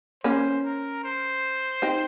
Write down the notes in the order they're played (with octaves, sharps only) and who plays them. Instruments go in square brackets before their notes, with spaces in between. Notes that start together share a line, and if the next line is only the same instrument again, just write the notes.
[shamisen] A#3 C#4 [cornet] C5
[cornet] A#4
C5
[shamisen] C4 D#4